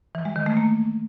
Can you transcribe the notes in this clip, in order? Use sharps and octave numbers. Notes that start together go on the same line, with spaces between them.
E3
G#3
D#3
A3
A#3